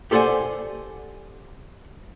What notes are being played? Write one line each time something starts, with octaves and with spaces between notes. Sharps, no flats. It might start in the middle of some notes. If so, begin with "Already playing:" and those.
G4 A4 C5 D5 F#5 G#5